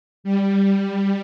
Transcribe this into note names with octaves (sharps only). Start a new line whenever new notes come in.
G3